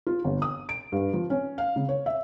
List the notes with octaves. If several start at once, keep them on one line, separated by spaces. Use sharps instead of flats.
F4
G1
D#6
D7
G2
F3
C#4
F5
C#3
C#5
E5